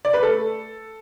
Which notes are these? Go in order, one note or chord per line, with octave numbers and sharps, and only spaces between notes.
D5
B4
A3 A4